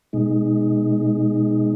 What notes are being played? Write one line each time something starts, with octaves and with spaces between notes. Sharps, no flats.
B2 G#3 D#4